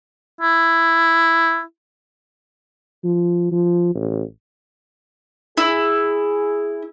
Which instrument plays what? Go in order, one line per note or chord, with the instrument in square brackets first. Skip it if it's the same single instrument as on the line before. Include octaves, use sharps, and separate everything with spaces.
[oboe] E4
[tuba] F3
F3
A1
[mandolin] E4 [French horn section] G#4